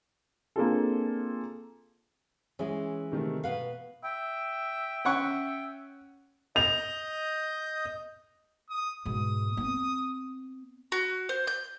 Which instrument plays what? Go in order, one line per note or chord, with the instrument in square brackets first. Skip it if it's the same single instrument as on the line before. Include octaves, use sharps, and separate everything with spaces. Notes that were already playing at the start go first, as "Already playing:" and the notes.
[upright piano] A#3 C4 D4 F4 G#4 A4
[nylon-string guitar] E3 G#3 [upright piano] C#4 G#4 E5
[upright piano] C3 D#3 A3
[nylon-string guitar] B2 B4 F5 [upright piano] F#5
[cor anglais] E5 [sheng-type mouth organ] G5
[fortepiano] C#4 F#5 C#6
[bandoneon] D#5 D#6 G6 [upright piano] F7
[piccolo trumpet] D#6
[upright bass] G#2 B2 [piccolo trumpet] D#6
[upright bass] B3 C4
[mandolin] F#4
C5
G6